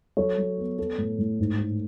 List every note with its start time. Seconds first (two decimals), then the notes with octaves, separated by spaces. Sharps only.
0.17 F#3 A4 C#5
0.38 F#3
0.58 B3
0.78 B3 A4
0.98 A2
1.19 A2
1.39 G#2
1.59 A3